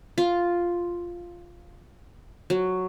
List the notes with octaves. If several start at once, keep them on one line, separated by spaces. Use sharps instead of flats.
F4
F#3